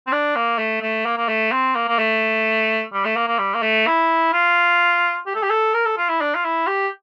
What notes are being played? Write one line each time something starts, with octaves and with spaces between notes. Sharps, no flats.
C4
D4
A#3
A3
A3
A#3
A#3
A3
C4
A#3
A#3
A3
G3
A3
A#3
A#3
G3
A#3
A3
E4
F4
G4
A4
G4
A4
A#4
A4
F4
E4
D4
F4
E4
G4